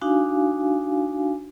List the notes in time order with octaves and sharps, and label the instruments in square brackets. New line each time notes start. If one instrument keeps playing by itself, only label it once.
[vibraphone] D4 D#4 F#4 F5 G#5